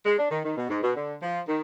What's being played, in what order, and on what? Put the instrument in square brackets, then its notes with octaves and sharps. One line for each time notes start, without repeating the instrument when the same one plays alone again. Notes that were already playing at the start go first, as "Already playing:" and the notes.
[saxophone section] G#3
D4
D#3
D#3
B2
G#2
B2
D3
F3
D#3